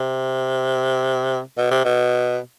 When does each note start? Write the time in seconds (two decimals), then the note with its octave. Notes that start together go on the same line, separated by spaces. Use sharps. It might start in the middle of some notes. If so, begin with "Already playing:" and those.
Already playing: C3
1.57 B2
1.71 C3
1.85 B2